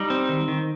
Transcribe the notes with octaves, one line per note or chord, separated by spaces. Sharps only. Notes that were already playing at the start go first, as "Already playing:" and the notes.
Already playing: G3 D#4
C4
D#3
D#3